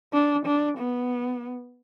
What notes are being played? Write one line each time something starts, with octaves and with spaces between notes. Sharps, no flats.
D4
D4
B3